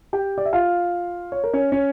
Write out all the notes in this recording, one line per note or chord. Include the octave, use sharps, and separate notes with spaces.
G4 G5
D5
E5
F4 F5
C#5
A#4
C#4 C#5
C#4 C#5